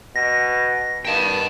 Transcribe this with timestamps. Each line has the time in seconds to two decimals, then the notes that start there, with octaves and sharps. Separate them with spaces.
0.16 B2 A#6
1.05 G2 D#3 B3 G5 A5